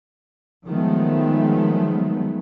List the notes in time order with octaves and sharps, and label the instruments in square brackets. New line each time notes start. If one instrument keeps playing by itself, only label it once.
[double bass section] D#3 F3 F#3 G#3 A3 B3